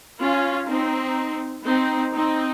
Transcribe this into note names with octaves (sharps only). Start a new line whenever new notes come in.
C#4 F4
C4 D#4
C4 D#4
C4 D#4